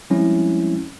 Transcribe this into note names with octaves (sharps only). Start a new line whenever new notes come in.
F3 G3 G#3 C4 C#4 E4